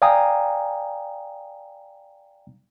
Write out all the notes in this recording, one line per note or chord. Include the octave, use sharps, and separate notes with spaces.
D5 F5 G5 G#5 A#5 D#6